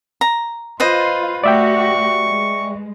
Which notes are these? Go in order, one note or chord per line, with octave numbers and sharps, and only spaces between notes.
A#5
F4 B4 C5 D#5 C6
A3 F#4 G4 D5 E5 G5 C#6
G#3